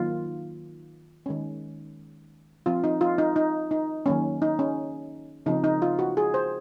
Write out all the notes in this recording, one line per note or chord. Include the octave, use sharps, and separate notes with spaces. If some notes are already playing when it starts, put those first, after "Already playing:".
Already playing: D#3 F#3 A#3 F4
D#3 G#3 C#4
F3 C4 F4
D#4
F4
D#4
D#4
D#4
D#3 F#3 A#3 C#4
D#4
C#4
C#3 F3 C4 D#4
D#4
F4
F#4
G#4
C5